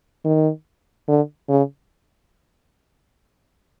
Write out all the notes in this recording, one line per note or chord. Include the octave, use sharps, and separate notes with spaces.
D#3
D3
C#3